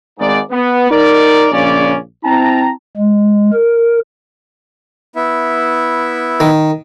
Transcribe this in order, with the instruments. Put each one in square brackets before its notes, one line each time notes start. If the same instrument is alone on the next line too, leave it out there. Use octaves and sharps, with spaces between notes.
[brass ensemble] G#1 G#2 D#4 D5
B3
D#4 A#4 D5
A#1 C#3 C#4 D5
C4 E4 G5 A5 A#5
[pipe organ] G#3
A#4
[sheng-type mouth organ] B3 E4 E5
[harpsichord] D#3